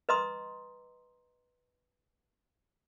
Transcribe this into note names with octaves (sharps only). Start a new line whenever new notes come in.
B4 D#5 A#5 C6 D#6